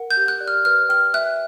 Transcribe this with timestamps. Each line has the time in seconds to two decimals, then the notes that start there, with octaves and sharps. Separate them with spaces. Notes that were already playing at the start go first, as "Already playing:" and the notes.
Already playing: A#4 F#5
0.11 G6
0.17 G4
0.28 F#6
0.40 D5
0.48 F6
0.65 B4 F6
0.89 G5 F6
1.14 E5 F#6